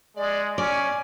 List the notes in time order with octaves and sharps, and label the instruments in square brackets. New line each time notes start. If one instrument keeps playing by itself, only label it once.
[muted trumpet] G#3 [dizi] D5
[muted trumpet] C#4 [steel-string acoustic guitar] D5 [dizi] G#5